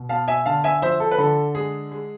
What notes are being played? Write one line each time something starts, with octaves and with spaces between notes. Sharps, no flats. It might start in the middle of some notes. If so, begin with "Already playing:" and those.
Already playing: B2
B3 F5 A5
E5 G#5
D3 F5 A5
E5 G#5
F3 C5 E5
A4
B4
D3 A4
G#3 G#4
G#3